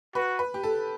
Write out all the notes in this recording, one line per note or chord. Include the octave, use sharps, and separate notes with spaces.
F#4 B4
B4
G4
A4